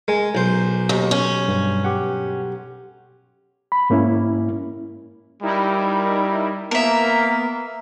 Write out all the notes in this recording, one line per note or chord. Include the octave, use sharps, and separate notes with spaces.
G#3 A#4 G#5
B1 C5
D#2
C#4
G2
G4 F#5
B5
G#2 A#3 C#4 E4
G3 D#4 E4 A#4
A#3 B3 A#4 E5